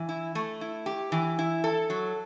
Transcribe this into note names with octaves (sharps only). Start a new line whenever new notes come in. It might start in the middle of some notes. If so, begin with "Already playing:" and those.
Already playing: E3
E4
A3
E4
G4
E3
E4
A4
F#3